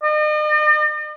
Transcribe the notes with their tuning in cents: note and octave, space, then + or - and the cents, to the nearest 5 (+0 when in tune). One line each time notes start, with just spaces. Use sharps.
D#5 -45